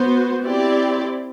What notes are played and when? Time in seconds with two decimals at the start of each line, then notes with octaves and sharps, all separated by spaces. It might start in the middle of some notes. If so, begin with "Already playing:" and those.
Already playing: B3 F#4 C5
0.45 C4 E4 G4 D5